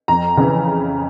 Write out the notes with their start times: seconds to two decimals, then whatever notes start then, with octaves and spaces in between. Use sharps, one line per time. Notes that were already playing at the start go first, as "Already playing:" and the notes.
0.08 F2 A#5
0.37 C#3 E3